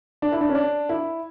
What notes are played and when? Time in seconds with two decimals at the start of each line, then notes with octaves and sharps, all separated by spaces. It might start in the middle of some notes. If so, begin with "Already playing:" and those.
0.22 D4
0.32 E4
0.41 D4
0.49 C#4
0.55 D4
0.89 E4